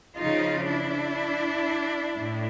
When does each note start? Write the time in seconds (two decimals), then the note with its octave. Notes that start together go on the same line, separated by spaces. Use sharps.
0.16 C#3 F3 D#4 F4
0.67 D4 E4
2.18 A2